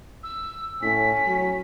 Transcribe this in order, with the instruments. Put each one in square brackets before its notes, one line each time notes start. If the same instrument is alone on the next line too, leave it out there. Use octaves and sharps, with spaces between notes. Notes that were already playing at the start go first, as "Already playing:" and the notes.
[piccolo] E6
[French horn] A2 [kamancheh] C#4 [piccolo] B6
[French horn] F#3